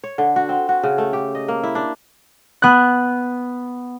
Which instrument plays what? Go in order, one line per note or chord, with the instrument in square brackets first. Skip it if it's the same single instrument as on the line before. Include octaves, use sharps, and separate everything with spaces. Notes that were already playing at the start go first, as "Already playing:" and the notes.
[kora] C#5
D3
F#4
C4
F#4
C#3
A3
G4
D#5
A#3
E4
D4
[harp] B3 F#6